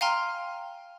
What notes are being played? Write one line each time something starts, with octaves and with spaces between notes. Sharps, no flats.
F5 G5 G#5 A#5 C6 F6